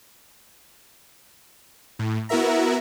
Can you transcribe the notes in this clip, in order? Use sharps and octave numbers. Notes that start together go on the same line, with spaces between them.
A2
B3 E4 F#4 A#4 E5 A#5